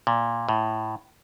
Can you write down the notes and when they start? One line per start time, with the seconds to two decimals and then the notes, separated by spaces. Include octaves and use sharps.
0.07 A#2
0.49 A2